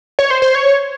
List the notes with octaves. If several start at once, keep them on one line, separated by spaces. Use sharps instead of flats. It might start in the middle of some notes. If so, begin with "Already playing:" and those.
C#5
C5
C5
C#5